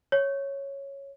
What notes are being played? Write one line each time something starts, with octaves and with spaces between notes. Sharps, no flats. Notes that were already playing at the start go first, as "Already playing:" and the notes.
C#5